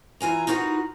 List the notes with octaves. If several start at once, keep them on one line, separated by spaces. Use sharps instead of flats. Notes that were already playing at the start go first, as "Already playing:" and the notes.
E3 F4 G#5 A#5
D#4 F4 F#4 A#4 B4